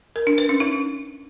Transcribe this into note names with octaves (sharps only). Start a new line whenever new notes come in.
A#4
D4
B4
C#4
D#4